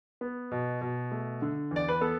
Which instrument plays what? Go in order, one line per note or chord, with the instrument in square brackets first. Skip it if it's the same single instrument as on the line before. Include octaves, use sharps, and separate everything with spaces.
[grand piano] B3
B2
B2
A3
D3
E2 D5
B4
B3 A4